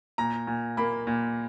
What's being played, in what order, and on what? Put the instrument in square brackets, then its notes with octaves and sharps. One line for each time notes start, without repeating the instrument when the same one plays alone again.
[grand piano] A#2 A#5
A#2
A#3 B5
A#2